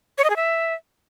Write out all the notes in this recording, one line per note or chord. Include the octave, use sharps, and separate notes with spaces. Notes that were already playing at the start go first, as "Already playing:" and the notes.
C#5
D#5
G#4
E5